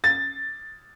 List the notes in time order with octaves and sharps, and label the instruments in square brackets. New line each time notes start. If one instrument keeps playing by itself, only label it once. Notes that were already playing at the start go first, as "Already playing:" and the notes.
[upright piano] A6